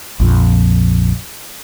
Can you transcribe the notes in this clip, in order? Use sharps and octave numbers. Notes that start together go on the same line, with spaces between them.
A#1 F2